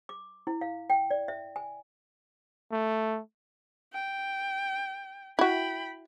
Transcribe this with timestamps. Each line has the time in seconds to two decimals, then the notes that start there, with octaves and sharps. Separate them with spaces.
0.09 D6
0.47 E4
0.61 F5
0.90 G5
1.11 D5
1.28 E5
1.56 G#5
2.72 A3
3.93 G5
5.39 E4 F#4 G5 B5